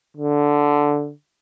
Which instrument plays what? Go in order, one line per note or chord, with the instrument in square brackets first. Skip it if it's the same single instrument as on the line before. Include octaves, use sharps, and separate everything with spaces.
[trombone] D3